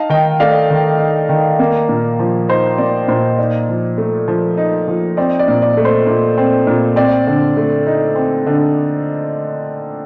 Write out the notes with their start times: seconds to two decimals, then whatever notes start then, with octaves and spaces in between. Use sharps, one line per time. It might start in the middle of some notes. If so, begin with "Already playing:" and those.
Already playing: D#4 F5 A5
0.10 D#3 D#5 G5
0.40 A3 D5 F5
0.70 D#3
0.99 D#4
1.29 D#3
1.59 A#3
1.89 A#2
2.19 F3
2.49 D#4 C5 D#5
2.78 A#3 D5
3.08 A#2 C5
3.38 D#4 D5
3.69 F3
3.98 A3
4.28 F3
4.57 D#4
4.88 F3
5.17 C4 D5
5.39 D5
5.48 A#2
5.62 D5
5.77 A3
5.85 C5
6.07 A#2
6.38 C4
6.67 A#2
6.96 C4 D5
7.27 D3
7.57 A3
7.87 D#4
8.16 C4
8.46 D3